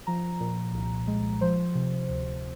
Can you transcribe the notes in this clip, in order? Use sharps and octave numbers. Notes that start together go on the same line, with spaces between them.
F3 A#5
A#2
C2
G#3
F3 C5
C3
D2